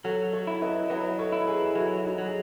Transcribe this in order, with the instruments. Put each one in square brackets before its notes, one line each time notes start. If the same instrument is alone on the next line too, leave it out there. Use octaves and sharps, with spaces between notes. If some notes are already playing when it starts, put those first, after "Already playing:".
[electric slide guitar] F#3 [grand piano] F#4 A4
[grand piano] A4 C#5
[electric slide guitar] E4
[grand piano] B4 D#5
[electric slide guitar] F#3 [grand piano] B4 D#5
[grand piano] A4 C#5
[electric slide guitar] E4
[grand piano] G#4 B4
[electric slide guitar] F#3 [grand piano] F#4 A4
[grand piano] D#4 F#4
[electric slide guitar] F#3
[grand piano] G#4